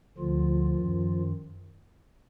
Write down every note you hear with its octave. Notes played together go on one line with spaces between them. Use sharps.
D2 D3 F3 F4
F#2 D#3